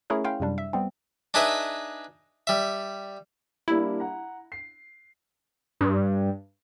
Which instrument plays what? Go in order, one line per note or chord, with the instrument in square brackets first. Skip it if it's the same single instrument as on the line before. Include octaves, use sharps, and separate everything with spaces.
[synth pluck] A3 C#4 E4 G#4 A#4 C#5
C#4 E4 F5 G5 C6
F#2 C3 G3 D4
E5
G3 B3 C4
[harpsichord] D4 D#4 G#4 B4 E5
G3 E5
[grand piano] G3 A#3 D4 [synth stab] E4
[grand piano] F#5 A#5
C7
[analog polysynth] G2